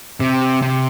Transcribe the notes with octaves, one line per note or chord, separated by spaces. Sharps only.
C3
C3